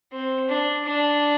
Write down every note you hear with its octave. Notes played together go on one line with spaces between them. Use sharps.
C4
D4
D4